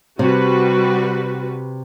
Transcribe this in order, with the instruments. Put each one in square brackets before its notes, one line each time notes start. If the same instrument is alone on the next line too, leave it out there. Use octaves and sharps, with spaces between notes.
[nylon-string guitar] C3 [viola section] G3 F#4 B4